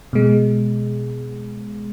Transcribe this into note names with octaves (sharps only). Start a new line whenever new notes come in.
B2 G#3